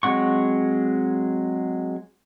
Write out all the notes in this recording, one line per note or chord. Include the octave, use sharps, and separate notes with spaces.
F#3 G#3 C4 F#5 C#6